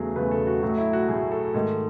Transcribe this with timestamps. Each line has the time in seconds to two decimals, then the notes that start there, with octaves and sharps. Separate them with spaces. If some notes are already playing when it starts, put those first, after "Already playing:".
Already playing: E2 C#3 F#3 A3 G#4
0.16 E2 C#3 F#3 A3 B4
0.31 A4
0.47 F#4
0.62 A2 F#3 A3 F#4
0.78 E4
0.93 F#4
1.08 A2 F#3 A3 G#4
1.31 A4
1.54 G#2 D#3 A3